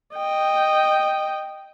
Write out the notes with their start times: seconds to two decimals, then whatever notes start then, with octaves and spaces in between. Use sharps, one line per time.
0.16 D#5 G5